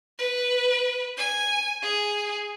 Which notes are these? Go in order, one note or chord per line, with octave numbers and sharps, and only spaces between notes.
B4
G#5
G#4